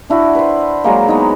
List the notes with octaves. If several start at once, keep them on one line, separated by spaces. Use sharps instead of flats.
D4 E4 F#4
B4 C5
F#3 G#3 A#3
B3 D#4